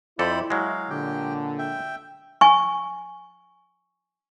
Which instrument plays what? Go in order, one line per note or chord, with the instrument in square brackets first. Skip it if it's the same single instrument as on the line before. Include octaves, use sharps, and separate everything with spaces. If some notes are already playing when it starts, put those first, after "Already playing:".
[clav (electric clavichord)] F2 A4 [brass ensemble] E4 [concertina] C5 D5 B5
[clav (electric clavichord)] F#3 G#3 [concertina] F5
[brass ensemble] A#2 D3 [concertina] G4 G5
[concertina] E5 G5
[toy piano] G#5 C#6